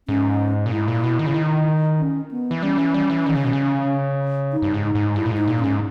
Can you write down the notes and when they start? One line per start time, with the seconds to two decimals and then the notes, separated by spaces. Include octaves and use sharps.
0.08 G#2 C#4
0.66 A#2
0.72 G#2 E4
0.88 A#2
1.04 B2
1.19 D#3
1.26 C#3
1.34 D#3
1.99 C#4
2.31 B3
2.51 E3
2.62 G3 C#4
2.78 E3
2.94 G3
3.10 E3
3.26 D#3
3.35 C#3
3.45 B2
3.53 C#3
4.53 D#4
4.62 G2
4.74 G#2
4.84 D#4
4.95 G#2
5.16 G2 E4
5.25 A#2
5.31 G#2
5.37 D#4
5.48 A#2
5.59 G#2 C#4